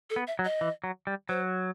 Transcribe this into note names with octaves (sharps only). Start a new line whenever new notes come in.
A4
B3
E5
F#3
D#5
E3
F#3
G3
F#3 C5